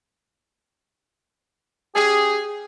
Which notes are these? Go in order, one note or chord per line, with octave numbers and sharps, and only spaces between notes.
C#4 G4 G#4